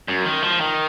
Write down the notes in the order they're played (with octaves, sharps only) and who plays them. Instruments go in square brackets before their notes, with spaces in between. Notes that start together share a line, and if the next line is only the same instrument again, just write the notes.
[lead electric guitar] F#2
D#3
F3
D#3